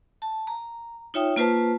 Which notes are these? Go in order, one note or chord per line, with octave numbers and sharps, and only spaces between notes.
A5
A#5
D#4 F4 C#5 E5 G5 D#6
A#3 F4 B4 C5 A5